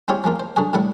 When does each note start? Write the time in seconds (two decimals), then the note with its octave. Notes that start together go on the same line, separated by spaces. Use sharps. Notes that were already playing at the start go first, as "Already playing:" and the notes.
0.08 G#3 C4 E4 F4 G4 C#5
0.24 F3 G#3 A#3 F4
0.40 C5
0.56 D3 F#3 F#4 G#4
0.73 A2 G3 E4 F#5